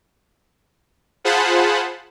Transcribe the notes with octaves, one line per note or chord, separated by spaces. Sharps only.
F4 G#4 C5 F#5 A5 B5